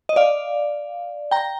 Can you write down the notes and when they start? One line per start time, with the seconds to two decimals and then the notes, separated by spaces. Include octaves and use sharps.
0.09 D#5
0.16 D5 F5
1.31 G5 A#5